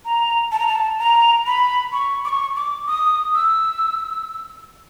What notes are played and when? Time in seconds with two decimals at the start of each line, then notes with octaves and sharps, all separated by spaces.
0.05 A#5
0.52 A5
0.59 A#5
0.67 A5
0.99 A#5
1.46 B5
1.93 C#6
2.25 D6
2.29 C#6
2.56 D6
2.87 D#6
3.35 E6